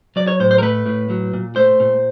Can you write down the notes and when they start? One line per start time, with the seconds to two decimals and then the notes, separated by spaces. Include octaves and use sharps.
0.16 F#3 D5
0.27 C#5
0.40 A2 C5
0.51 C5
0.58 A#4
0.62 A3 B4
0.86 A2
1.10 F#3
1.33 A#2
1.56 A3 C5
1.80 A#2